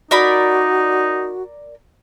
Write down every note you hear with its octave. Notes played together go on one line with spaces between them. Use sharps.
D#4 F#4 A#4 D5 B5